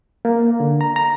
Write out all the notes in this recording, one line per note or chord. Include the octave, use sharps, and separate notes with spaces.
A#3
D3
A#5
A#5